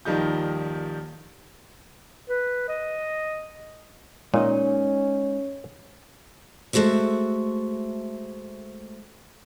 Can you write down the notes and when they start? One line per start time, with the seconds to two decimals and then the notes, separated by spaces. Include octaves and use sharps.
0.05 D#1 D#3 F3 G3 D#4 G6
2.29 B4
2.69 D#5
4.34 A#2 G#3 C#4 D#4 C#5 D#5
6.73 G#3 A3 F#4 C5 E5